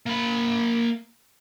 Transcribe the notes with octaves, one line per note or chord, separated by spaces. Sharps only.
A#3 B5